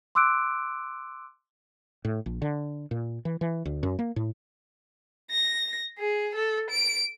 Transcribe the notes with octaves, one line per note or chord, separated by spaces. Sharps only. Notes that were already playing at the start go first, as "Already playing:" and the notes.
C6 D6 E6 F#6 D7
A2
A#1
D3
A#2
E3
E3
D2
F#2
A#3
A2
A#6
G#4
A4
D7